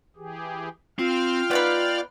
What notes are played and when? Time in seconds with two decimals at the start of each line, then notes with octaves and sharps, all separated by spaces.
0.16 E3 G4 G#4
0.99 C4 F4 F5 G5 F6
1.51 B3 D#4 B4 D5